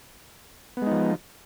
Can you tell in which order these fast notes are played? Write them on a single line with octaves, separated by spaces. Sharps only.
B3 G#3 D#4 F3